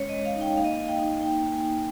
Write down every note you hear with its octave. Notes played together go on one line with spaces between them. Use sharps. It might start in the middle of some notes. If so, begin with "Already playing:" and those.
Already playing: G#3 C#4 C#5
D#5
G#3
F5
D#4
G5
A#3 F5
D#5
F5
A#3
G5
D#4
A#3 G5
A#3
G#5
D#4